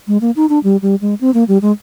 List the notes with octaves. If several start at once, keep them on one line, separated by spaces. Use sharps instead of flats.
G#3
A#3
D#4
D4
G3
G3
G#3
C4
A#3
G3
G#3